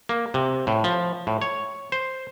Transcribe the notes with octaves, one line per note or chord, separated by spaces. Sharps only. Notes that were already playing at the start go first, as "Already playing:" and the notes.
A#3
C3
A2
F3
A2
C#5
C5